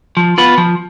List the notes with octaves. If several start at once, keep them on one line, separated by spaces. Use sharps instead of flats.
F3
B3 F4 B4
F3